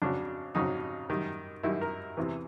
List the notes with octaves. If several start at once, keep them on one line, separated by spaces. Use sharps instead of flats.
F2 C#3 F#3 D4
F2 C#3 F#3 D#4
F#2 D#3 G3
F#2 D#3 G3 E4
A#4
E2 C3 E3